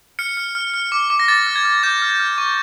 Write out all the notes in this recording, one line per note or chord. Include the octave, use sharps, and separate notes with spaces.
F6 C#7
F6
F6
F6
D6
D6
A#6
D6 A6
F6
G#6
F6
D6 G6
F6
F6
C#6